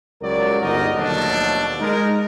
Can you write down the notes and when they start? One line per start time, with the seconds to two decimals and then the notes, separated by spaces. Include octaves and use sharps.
0.22 C#2 F#3 G3 A#4 D5
0.61 G1 G#3 D#4 F#4 A#4 D#5
0.96 D#2 B2 F3 F#3 A3 D4
1.81 G#3 D#4 A#4